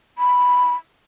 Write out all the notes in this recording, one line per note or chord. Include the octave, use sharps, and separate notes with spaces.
B5